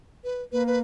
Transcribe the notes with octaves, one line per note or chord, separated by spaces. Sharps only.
B4
A#3 B4
B4